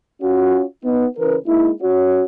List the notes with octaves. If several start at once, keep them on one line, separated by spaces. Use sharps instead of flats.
C#4 F4 F#4
B3 D#4
C#3 E3 C#4 A#4 B4
G#3 A#3 D#4 E4
C#4 F#4 C#5